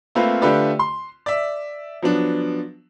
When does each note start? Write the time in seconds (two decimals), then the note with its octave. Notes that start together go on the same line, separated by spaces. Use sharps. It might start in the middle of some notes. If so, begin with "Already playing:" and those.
0.15 A3 A#3 C4 F4 B4
0.42 D3 A3 F4 G4 B4 D5
0.79 C6
1.26 D5 E5
2.02 F3 F#3 B3 D4